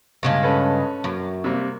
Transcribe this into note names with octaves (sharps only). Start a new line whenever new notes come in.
G2 C#3 G#3
C#4 A4 B4
F#2
C3 G3 A#3